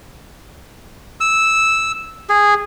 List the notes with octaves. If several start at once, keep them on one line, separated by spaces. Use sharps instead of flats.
E6
G#4